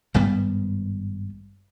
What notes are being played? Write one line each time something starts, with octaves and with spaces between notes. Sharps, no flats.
G#1 G2 G3 B3